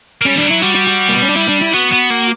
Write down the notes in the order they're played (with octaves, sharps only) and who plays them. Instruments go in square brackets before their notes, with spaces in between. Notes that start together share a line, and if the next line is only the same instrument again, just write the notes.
[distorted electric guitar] A#3
[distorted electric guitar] G3 [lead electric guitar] C#4
[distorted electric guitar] E3 [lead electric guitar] D4
[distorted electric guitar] F#3
[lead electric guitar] E4
[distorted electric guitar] G3 [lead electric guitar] F#4
[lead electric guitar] F#4
F#4
A#3
B3
C#4
D4
E4
D4
E4
[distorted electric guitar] B3 [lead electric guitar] F#4
[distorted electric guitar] B3
A#3